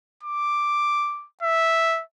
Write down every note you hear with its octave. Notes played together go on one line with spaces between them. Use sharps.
D6
E5